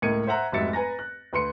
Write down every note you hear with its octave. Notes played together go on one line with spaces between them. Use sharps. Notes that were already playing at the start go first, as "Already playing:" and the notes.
C#2 A2 A#3 G#6 C#7 D#7
C5 E5 F#5 A#5 F#6
F1 G#2 F#3 E5 A6 C#7
B4 G#5 A#5 A#6
F#6
D2 B4 C6 C#7